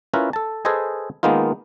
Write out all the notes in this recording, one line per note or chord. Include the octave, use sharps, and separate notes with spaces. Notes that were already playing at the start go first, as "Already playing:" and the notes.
C#4 E4 F4 A#4 B4
A4 A5
G#4 A4 B4 C5 D#5 G#5
D#3 G#3 A#3 B3 D#4 F4